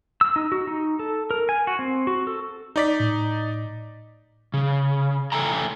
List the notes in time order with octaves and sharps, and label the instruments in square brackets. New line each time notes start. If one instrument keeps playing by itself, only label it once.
[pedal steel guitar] E6
D#4
F#4
D#4
A4
A#4
G#5
F#4
C4
F#4
A4
[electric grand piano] D#4 D5 B6
[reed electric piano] A2
[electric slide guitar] C#3
A4 E5 G5 G#5 A#5